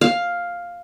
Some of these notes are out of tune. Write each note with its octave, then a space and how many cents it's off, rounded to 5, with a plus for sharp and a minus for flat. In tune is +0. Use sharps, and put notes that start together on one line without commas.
F5 +5